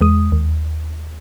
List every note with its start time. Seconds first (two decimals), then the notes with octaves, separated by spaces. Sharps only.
0.01 E2 G#3 D#6
0.32 D#2